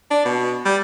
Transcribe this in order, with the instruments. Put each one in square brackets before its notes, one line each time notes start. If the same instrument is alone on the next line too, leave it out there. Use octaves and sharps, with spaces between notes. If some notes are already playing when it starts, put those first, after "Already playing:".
[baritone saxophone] D4
B2
G3